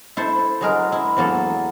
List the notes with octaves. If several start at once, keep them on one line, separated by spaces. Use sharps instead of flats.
E4 A4 C5
F#3 G#3 A#4
E4
E2 F#3 A#3 A4